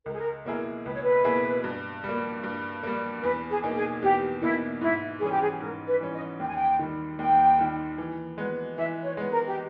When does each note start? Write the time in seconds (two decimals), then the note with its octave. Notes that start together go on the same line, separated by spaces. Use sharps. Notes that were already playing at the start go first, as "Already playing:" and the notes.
0.06 C#2 A#4
0.13 G#4
0.20 A#4
0.45 B2 A#3 E4 G#4 A#4
0.85 C#2 B4
0.94 C#5
1.03 B4
1.24 B2 A#3 E4 G#4
1.64 G2
2.04 G3
2.09 A#3
2.44 G2
2.83 G3 A#3
3.23 E2 B4
3.49 G#4
3.63 B2 A#3 D#4
3.76 G#4
4.02 E2 G4
4.42 B2 A#3 D#4 E4
4.81 G#2 E4
5.21 E3 G3 C#4 G#4
5.31 G4
5.41 G#4
5.60 G#2 A#4
5.87 B4
6.00 E3 G3 C#4
6.13 D#5
6.40 D#2 G5
6.48 G#5
6.56 G5
6.79 D#3 G3
7.19 D#2 G5
7.58 D#3 G3
7.98 E3
8.38 G#3 B3
8.77 E3 E5
9.03 C#5
9.17 G#3 B3
9.30 A#4
9.47 G4